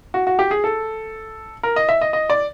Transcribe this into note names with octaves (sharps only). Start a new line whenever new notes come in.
F#4
F#4
G4
G#4
A4
A#4
D#5
E5
D#5
D#5
D5